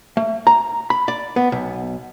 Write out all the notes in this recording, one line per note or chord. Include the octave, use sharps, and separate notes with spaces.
A3
A#5
B5
D5
B3
B1